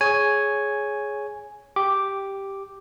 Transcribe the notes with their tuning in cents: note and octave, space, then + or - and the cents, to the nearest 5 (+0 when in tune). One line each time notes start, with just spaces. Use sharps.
G#4 +10 C#5 +0 G#5 +0
G4 +0 D6 +0